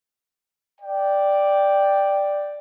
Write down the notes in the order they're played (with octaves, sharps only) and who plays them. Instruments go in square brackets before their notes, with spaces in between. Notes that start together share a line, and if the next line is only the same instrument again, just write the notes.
[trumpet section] D5 G5